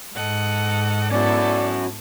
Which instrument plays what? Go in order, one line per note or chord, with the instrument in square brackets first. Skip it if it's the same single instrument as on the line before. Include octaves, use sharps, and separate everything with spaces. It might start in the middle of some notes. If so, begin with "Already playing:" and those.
[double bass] G#2 [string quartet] A4 D#5 F#5
[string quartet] B3 E4 A4 [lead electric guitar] C#4 F#4 [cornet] D5